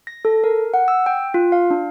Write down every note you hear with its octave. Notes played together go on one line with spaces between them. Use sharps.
A#6
A4
A#4
F#5
E6
G5
F4
F5
D4